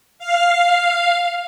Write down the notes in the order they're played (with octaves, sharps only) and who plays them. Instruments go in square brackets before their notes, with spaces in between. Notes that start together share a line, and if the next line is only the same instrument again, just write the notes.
[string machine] F5